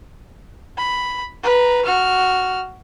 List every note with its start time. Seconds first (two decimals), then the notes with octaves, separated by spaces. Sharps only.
0.78 B5
1.44 B4 A#5
1.85 F#4 F6